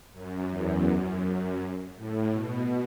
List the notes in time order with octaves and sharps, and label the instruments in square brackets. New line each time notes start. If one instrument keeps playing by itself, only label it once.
[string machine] F#2
E2
F#2
A2
B2